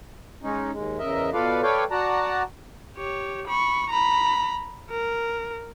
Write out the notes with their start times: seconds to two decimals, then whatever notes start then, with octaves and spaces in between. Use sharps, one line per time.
0.43 G#3 C#4 D#4
0.72 D#2 G#3
0.99 E2 C#3 A#4 D#5 E5
1.33 B2 F4 A4 B4 D5 F5
1.63 A4 B4 C#5 D5 F5 G5
1.91 F#4 D5 F#5 A5 A#5
2.97 G4 C#5
3.47 B5 C#6
3.90 A#5 B5
4.90 A#4